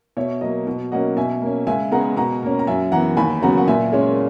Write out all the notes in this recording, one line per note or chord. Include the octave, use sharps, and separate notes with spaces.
B2 C#5 E5
F#3 A#3 D#5
B2
F#3 A#3 C#4 D#5 F#5
B2 E5 G#5
A#3 C#4
C#2 E5 G#5
C#3 G#3 B3 F#5 A#5
B2 F#5 A#5
A#3 C#4
A#5
F#2 E5 G#5
E3 B3 F#5 A#5
D#2 G#5 B5
C#3 F#3 B3 F#5 A#5
F#5
A#2 E5 G#5
G#3 C#4 C#5